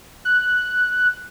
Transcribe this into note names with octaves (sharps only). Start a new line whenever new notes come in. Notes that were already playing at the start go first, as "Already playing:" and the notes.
F#6